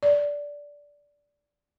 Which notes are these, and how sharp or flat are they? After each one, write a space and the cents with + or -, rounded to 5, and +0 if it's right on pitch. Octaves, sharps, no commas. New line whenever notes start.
D5 -10